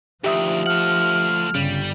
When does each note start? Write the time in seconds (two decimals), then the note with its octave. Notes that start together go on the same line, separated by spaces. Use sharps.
0.24 D2 D#3 F3 G4 E5 D#6
0.66 A3 F#5 F6
1.55 G1 C#3 G3